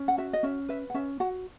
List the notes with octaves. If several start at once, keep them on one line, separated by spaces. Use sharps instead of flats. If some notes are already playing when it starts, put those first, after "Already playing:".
Already playing: C#4
F#5
F#4 E5
D#5
C#4 E5
B4 E5
F#5
C#4 E5
F#4 F#5